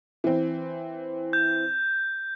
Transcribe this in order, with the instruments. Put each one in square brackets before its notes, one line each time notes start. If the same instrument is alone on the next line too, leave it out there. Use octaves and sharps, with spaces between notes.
[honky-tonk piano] E3 C4
[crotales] G6